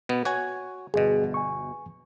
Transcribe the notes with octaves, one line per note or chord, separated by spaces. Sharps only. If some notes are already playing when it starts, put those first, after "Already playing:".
B2 B3
F#4 C#5 G#5
G1 B2 G#4 D#5
G#5 C#6